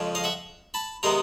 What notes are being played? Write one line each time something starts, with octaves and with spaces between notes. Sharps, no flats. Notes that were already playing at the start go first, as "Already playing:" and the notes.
Already playing: F2 C#3 F3 G#3
D#5 F5
E5 F#5
A5 B5
C3 D#3 G#3 B3 A#5 C6